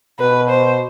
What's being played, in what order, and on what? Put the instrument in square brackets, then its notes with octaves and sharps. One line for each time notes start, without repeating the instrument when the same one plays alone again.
[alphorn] B2 [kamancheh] B4
[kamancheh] C5